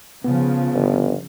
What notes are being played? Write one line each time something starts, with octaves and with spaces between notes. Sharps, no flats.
C#3 F3 B3
G1